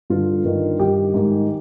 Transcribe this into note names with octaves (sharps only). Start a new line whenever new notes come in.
G2 D3 F4
G2 D#3
G2 D#3 G4
G#2 D#3